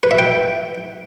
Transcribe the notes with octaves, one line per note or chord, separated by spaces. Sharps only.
B4
E5
G5